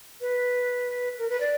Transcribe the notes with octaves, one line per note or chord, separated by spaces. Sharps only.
B4
A#4
B4
D5